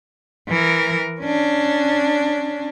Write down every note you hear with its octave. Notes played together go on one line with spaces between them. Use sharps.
E3 A#4
C#4 D4